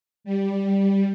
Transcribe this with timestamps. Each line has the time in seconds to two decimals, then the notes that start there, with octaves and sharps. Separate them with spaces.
0.24 G3